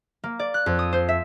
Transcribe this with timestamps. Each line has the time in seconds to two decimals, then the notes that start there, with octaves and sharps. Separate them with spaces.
0.24 A#3
0.39 D5
0.54 F#6
0.66 F2
0.79 D#6
0.93 C5
1.09 E5